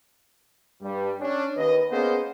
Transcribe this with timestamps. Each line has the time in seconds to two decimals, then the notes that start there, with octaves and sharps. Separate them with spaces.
0.82 G2 G3
1.20 C#4 D4
1.57 D#2 B4 D#5
1.91 A#3 B3 C#4 G#4 C5 D#5